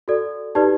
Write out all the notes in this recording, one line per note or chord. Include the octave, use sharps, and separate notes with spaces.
F#4 A4 D5
D#4 G4 B4 D5 A5